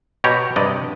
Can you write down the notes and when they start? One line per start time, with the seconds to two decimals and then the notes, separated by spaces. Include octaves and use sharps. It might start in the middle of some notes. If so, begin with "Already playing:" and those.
0.24 B2 G4 C#5 A#5
0.56 G2 C3 D5 D#5